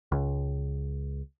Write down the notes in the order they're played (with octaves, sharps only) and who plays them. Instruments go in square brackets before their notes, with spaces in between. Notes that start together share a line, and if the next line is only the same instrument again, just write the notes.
[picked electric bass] C#2